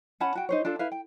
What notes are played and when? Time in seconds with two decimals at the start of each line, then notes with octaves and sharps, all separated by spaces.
0.20 C#4 F#5 A5 B5
0.35 F#4 G5
0.49 D#4 C5 C#5
0.65 D4 F4 A4
0.79 E4 B4 E5 F5
0.92 G5